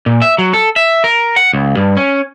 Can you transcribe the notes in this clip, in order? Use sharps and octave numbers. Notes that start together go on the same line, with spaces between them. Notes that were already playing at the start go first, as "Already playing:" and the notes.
A#2
E5
F#3
A4
E5
A#4
F#5
C#2
G2
C#4